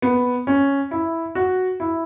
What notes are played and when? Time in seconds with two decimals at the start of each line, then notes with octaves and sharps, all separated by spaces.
0.02 B3
0.47 C#4
0.91 E4
1.35 F#4
1.80 E4